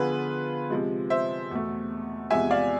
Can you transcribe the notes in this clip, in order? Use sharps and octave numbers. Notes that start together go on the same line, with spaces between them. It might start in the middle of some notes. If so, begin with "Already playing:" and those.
Already playing: D3 F3 B3 F4 G#4 B4
C3 F3 G#3
C5 E5
E2 B2 A3
E2 C3 F3 G#3 E5 G#5
D5 F5